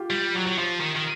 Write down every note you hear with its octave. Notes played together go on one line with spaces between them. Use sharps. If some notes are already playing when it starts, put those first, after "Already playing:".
Already playing: F4 G4
G3
F#3
F#3
F3
D#3
D#3